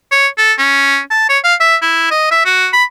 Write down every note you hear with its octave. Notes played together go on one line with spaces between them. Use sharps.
C#5
A4
C#4
A5
C#5
F5
E5
E4
D#5
E5
F#4
B5